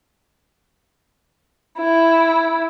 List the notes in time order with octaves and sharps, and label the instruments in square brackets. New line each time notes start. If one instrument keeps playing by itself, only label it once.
[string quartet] E4